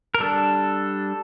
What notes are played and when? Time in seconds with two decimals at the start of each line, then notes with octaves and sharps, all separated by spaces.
0.15 A#4
0.20 G3 D4 A4